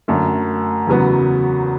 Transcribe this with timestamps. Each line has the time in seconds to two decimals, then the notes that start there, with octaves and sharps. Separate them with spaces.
0.08 F#2 D3 A3
0.87 E2 C#3 F#3 B3